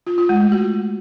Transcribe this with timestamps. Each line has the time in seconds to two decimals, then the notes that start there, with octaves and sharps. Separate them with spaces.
0.07 F4
0.18 F4
0.29 G#3
0.41 A3
0.52 F#4